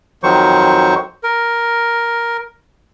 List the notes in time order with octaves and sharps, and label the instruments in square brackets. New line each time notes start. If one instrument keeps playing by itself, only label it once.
[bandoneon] F2 D#3 F#3 C5 C#6
A#4